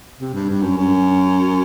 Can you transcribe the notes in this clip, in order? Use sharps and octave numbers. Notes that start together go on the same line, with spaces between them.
C3
G2
G2
F#2
F#2